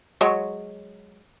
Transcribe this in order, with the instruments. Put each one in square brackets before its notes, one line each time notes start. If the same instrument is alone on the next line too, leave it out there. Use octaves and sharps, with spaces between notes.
[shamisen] F#3 G#3 C#5